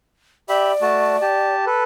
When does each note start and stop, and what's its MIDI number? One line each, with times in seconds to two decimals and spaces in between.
0.49 0.72 67
0.49 1.55 74
0.49 0.72 76
0.49 0.72 83
0.82 1.16 57
0.82 1.16 66
0.82 1.16 81
1.21 1.65 67
1.21 1.65 81
1.67 1.84 69
1.67 1.84 71